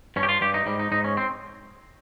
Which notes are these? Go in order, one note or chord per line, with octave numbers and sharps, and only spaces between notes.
G2 C#4
G4
F4
G2 G4
D#4
G#2 G3
D#4
G#2 D#4
C#4
C4